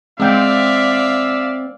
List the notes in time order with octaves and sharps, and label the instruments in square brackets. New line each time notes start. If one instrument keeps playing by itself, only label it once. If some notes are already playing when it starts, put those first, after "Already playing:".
[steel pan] G#3 G5 [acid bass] C4 [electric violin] D5 F5 [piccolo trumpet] E5